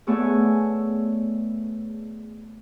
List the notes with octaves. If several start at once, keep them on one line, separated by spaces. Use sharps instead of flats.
A3 B3 G#4 C#5 D5 E5